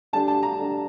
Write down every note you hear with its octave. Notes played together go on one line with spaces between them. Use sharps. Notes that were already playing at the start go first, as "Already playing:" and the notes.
D3 G3 D4 A5
A5
A#5
D3 G3 D4